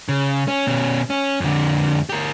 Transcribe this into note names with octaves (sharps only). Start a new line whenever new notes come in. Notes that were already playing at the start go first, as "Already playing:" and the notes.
C#3
C#4
B2 C#4
C#4
F2 D3
G4 A#4